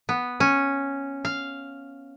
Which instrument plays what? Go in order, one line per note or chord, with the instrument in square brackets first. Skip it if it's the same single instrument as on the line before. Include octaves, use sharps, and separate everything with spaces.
[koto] B3
C#4
F5